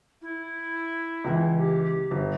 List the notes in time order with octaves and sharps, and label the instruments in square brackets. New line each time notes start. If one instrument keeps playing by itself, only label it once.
[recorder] E4
[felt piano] C#2 E3
[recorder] G4
[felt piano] G1